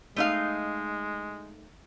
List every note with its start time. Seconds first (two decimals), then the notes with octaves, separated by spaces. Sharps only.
0.16 G#3 A3 D#4 F5